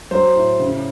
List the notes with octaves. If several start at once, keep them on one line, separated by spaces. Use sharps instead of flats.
F#3 C5
A2
C#3